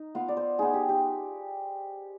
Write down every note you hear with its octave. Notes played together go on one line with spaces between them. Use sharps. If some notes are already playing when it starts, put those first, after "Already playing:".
Already playing: D#4
B3 F4 F5
D5
C5
B3 D#4 G#4
G4
G4